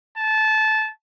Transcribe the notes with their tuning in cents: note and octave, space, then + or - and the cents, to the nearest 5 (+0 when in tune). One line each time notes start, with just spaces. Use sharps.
A5 -20